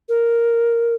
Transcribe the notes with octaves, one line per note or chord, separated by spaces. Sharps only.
A#4